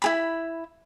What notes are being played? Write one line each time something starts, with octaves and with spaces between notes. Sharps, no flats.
E4 G#4 B5